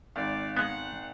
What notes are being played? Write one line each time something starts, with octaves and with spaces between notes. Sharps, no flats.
G#1 D5 F5
G#3 B3 F#5